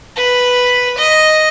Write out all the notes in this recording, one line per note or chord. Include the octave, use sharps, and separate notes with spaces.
B4
D#5